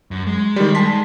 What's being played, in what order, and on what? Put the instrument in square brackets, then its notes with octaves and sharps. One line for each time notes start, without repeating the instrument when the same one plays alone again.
[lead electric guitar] F#2
G#3
[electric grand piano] D#3 G3
A5 C6 B6